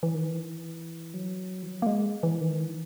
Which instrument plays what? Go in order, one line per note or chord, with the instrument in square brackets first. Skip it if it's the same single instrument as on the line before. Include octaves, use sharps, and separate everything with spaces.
[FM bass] E3
D#3
E3
F#3
E3
F#3
A#3
G#3
E3
D#3
E3